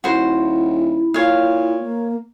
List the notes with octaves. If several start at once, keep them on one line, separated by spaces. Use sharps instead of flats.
D#1 E4 F#4 C5
A#2 C#5 F5
A#3